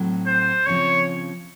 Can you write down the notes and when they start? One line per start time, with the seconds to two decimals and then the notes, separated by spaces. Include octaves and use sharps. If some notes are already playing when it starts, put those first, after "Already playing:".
Already playing: A2 F#3 C4
0.27 C5
0.66 C#3 F3 C4 C#5